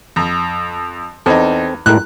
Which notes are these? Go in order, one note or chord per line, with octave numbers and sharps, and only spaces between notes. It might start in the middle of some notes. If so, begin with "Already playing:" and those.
F2
E2 C4 D#4 A4
A2 G#3 A#4 F#6